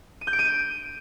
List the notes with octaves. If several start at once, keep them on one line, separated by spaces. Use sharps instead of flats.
D#7
G6
D7
D#7